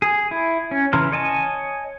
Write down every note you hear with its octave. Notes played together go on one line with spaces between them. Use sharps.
G#4
E4
C#4
C#3 E3 A#5 C6 F6
C#5 D#5 G#5 A5